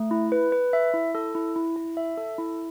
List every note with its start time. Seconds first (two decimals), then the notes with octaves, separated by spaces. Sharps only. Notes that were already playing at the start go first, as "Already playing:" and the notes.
Already playing: A3
0.11 E4
0.32 B4
0.52 B4
0.73 E5
0.94 E4
1.15 A4
1.35 E4
1.56 E4
1.76 E4
1.97 E5
2.17 A4
2.38 E4